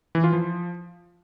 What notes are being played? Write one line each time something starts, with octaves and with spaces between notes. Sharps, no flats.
E3
F4
F3